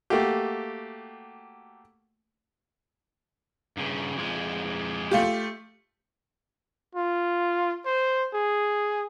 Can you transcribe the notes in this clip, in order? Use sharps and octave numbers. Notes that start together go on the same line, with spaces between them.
A3 A#3 F#4 G4
G2 C#3
F2 G#3
A3 F4 G4
F4
C5
G#4